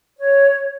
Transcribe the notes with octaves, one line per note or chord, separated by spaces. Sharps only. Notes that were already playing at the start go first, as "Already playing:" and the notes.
C#5